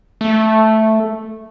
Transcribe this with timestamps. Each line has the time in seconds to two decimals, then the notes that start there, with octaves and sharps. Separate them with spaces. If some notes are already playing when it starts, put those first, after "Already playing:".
0.21 A3